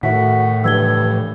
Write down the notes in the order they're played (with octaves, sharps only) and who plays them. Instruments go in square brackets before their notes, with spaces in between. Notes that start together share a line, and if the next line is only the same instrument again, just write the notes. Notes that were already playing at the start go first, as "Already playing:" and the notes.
[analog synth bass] A2 [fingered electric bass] D#3 [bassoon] F#4 [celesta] E5 B6
[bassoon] G2 [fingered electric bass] C#3 E3 F3 [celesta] E6 G#6 G7